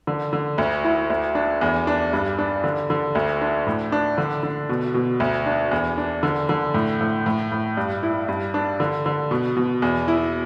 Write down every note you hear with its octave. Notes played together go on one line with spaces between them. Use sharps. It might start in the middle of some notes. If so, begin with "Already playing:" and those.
D3
D3
D2
E4
D2
D4
E2
D4
G2
D4
D3
D3
D2
D4
A2
D4
D3
D3
B2
B2
D2
D4
E2
D4
D3
D3
A2
A2
A2
A2
G2
E4
G2
D4
D3
D3
B2
B2
E2
E4